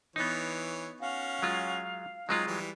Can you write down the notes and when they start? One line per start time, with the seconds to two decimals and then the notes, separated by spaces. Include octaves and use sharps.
0.16 E3 B3 D#4 C#5
1.01 C#4 F#4 F5
1.42 F#3 G#3 F4
2.29 F#3 G#3 C4 D#4 F4
2.47 E3 G3